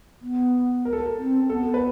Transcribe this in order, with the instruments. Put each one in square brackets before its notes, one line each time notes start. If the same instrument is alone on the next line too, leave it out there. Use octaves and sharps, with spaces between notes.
[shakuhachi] B3
[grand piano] A#4
A4
A#4
[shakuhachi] C4
[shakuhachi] B3 [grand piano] A4
[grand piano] B4